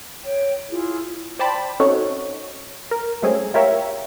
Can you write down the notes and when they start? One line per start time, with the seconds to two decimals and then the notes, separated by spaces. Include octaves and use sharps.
0.24 C#5 G5
0.69 E4 F4 G#4
1.39 C5 D5 G5 A5 B5
1.80 C4 C#4 D#4 F#4 A4 C#5
2.91 A#4
3.22 F#3 G#3 A3 C4 C#4 G#4
3.54 E4 F4 G4 A#4 C#5 E5